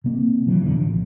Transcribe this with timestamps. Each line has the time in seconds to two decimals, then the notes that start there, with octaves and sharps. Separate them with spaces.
0.04 C3 A#3 C4
0.46 B2 D#3 E3 F#3
0.62 F1 C#2 B2 D3
0.78 A1 F3